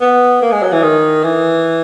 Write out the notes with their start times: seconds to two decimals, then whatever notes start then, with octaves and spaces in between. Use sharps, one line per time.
0.01 B3
0.42 A#3
0.52 G#3
0.63 F#3
0.72 E3
0.82 D#3
1.23 E3